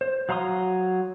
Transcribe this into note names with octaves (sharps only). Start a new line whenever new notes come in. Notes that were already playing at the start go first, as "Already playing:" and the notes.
C5
F#3 F5 A#5 C6 D#6